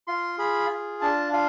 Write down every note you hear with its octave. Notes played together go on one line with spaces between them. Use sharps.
F4 C6
G#4 B5
F4
D4 A5
F4 F5